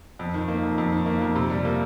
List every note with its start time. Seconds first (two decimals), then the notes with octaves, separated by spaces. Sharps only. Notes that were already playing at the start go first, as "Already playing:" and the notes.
0.19 F2
0.34 D#3
0.48 A#3
0.63 F2
0.78 F2
0.92 D#3
1.06 A#3
1.21 F2
1.36 C3
1.51 G3
1.65 A#3